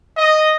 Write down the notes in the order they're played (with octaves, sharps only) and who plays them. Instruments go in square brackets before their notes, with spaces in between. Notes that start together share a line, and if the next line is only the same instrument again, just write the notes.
[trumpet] D#5